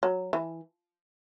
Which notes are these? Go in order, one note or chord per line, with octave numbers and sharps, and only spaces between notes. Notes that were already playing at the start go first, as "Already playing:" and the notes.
F#3
E3